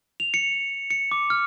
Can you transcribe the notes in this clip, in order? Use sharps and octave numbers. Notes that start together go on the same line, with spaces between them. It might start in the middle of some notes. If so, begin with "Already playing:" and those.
F7
C#7
C#7
D6
F6